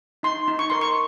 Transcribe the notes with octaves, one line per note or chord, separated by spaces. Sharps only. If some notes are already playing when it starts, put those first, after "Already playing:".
D#4 C6
D#4
C#6
A#4 C6
C#6